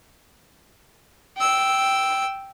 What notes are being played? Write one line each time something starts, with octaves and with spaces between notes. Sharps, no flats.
G5 E6